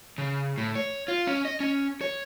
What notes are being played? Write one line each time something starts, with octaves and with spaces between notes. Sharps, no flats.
C#3
A2
C#5
F4
C#4
D#5
C#4
C#5